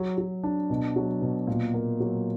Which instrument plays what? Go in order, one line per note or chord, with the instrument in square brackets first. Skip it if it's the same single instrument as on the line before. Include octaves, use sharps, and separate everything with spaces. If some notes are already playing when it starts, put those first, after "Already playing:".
Already playing: [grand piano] F#3
F#3
D4
B2
F#3
B2
A#2
A#3
F#3